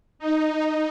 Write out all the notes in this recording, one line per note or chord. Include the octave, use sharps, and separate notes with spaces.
D#4